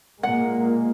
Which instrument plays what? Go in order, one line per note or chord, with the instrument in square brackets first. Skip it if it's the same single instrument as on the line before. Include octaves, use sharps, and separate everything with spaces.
[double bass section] A#2 G#3 A#3 [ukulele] F#5